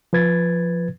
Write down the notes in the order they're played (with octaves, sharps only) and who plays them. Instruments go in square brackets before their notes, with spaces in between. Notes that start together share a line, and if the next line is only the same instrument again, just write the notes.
[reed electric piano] F3 B4 G#6 A6